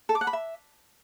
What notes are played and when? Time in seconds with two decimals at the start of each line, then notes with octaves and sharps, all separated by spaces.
0.09 A4
0.15 D6
0.21 F#5
0.27 B5
0.33 E5